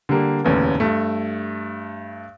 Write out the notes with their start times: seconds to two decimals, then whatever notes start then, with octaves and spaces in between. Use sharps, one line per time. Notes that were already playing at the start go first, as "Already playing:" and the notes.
0.09 D3 G3 A#3
0.44 F1 D#2 A2 C#3 B3
0.80 G2 A3